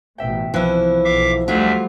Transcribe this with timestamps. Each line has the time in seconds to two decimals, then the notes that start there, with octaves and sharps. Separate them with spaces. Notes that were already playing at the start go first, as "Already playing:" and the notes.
0.18 A1 B2 E5 G5
0.54 C2 E3 F3 E4 F#6
1.05 B1 E5 F5 D6
1.48 D2 F#3 G3 A3 D4 F4 E5